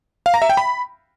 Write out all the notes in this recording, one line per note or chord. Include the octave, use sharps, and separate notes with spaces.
F5
A#5
E5
G5
B5